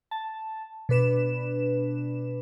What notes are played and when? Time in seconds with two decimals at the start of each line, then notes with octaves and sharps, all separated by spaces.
0.11 A5
0.89 B2 D4 B4 E7